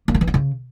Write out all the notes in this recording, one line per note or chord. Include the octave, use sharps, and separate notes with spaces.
A#3
D#3
E3
B3
C#3